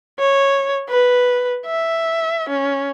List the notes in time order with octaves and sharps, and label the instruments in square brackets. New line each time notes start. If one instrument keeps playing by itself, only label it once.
[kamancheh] C#5
B4
E5
C#4